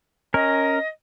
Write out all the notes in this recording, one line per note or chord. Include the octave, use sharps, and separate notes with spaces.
C#4 A#4 D#5